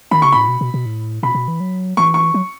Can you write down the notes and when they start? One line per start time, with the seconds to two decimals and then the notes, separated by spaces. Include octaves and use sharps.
0.11 D#3 B5
0.22 C#3 C#6
0.32 A2 B5
0.48 B2
0.61 B2
0.74 B2
0.86 A2
1.23 B2 B5
1.35 B2
1.48 E3
1.60 F#3
1.97 E3 C#6
2.14 C#6
2.34 F#3